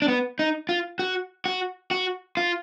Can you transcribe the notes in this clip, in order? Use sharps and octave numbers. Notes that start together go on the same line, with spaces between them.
D4
B3
D#4
F4
F#4
F#4
F#4
F4